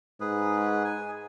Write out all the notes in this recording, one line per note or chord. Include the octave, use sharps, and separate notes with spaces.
G#2 G#4 B4
G#5